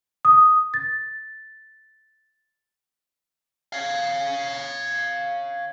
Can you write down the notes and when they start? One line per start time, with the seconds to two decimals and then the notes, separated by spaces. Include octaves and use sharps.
0.25 D#6
0.74 A6
3.73 C#5 F5